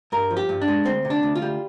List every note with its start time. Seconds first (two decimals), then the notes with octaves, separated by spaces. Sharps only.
0.12 G2 A#4
0.31 F3
0.37 G4
0.49 G2
0.61 D4
0.68 G#3
0.85 D2 C4
1.05 C3
1.10 D4
1.23 D2
1.36 F4
1.42 G3